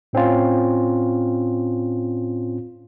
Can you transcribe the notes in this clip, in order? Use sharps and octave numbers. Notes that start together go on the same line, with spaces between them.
A2 C4 C#4 F4